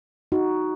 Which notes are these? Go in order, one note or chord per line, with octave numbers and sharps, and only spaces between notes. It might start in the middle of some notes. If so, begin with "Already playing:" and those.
D#4 F#4